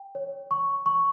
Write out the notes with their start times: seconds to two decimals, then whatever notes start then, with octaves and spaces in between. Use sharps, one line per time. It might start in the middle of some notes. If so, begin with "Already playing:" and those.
Already playing: G5
0.15 C#5
0.51 C#6
0.86 C#6